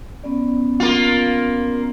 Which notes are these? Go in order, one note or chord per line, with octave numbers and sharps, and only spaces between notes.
B3 C#4 D5
A#3 F4